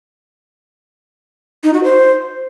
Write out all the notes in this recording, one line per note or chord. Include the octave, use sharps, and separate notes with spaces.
D#4
F#4
C5